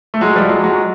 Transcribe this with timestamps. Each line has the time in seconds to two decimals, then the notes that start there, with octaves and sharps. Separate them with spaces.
0.14 A3
0.21 F#3 G#3
0.36 F3 G3
0.49 F#3 G#3
0.64 F#3 G#3